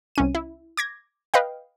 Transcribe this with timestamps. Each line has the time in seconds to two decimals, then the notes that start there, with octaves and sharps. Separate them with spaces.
0.16 C2 C#4 D#7
0.35 E4
0.77 D6 G#6 A#6
1.34 B4 D#5 F5 G5